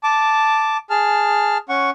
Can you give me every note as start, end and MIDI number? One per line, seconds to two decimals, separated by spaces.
0.03 0.77 81
0.03 0.77 86
0.90 1.57 68
0.90 1.57 81
0.90 1.57 89
1.69 1.90 61
1.69 1.90 78
1.69 1.90 85